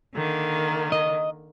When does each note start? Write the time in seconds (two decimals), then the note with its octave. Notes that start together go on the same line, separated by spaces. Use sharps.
0.14 D3 D#3 A#3
0.92 D#5